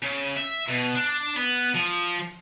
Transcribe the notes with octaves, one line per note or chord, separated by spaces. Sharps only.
C#3
E5
B2
D4
B3
F3